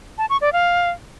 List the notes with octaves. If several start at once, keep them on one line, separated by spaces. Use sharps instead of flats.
A5
C#6
D5
F5